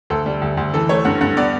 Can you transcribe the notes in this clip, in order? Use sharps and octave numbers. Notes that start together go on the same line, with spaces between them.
D2 A4
G3
D2
D2
E3 A4
A3 C#5
G2 F#5
G2 F#5
B3 D5